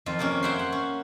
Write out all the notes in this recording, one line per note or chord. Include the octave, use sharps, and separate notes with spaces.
F2 D#3 F4
C3 A#3 C#4
C5 C#5 E5 F#5 G5 C6
F#5
C#4